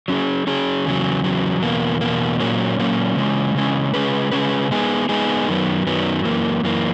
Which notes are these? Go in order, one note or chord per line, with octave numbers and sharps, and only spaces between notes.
F#3 C#4 G#4
F#3 C#4 G#4
E2 C#3 F#3
E2 C#3 F#3
E2 B2 A#3
E2 B2 A#3
A#2 F#3 A#3 C#4
A#2 F#3 A#3 C#4
C#3 E3 G#3 C#4
C#3 E3 G#3 C#4
C#3 G#3 C#4 G#4 B4
C#3 G#3 C#4 G#4 B4
G#3 B3 D#4 G#4
G#3 B3 D#4 G#4
F#2 D#3 F#3 B3
F#2 D#3 F#3 B3
F#2 E3 A#3
F#2 E3 A#3